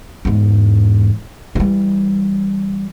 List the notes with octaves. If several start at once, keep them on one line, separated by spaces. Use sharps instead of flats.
E2 G#2
E3 G3